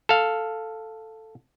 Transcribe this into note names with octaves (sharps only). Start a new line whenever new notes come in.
A4 F5